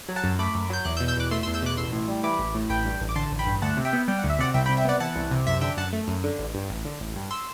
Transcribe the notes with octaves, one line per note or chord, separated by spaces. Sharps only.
F#3
F#5 A5
F#2
A3 B5 D6
F#2
F#3 G6
E2 D6 F#6
E6 G6
B2
E6 G6
E2 D6 F#6
A3 C6 E6
C6 E6
E2
E6 G6
B2 D6 F#6
A1 C6 E6
A2
G3
E3 B5 D6
A1
A2
A1 G5 B5
G2
A1
D6
D3 A5 C6
A1
G5 B5
G2
D2 F#5 A5
C3
E5 G5
B3
G3 G5
D2 F#5
E5
C3 D5 F#5
C2 E5 G5
G5 B5
C3
E5 G5
B3 D5 F#5
E3 F#5 A5
C2
C3
F#2 E5
D3 E5 G5
F#2 F#5 A5
A3
F#2
D3
A1
G2
A1
D3
A1
G2
C6 E6